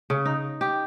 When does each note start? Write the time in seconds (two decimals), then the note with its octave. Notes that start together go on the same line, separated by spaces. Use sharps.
0.10 C#3
0.25 D#4
0.61 G4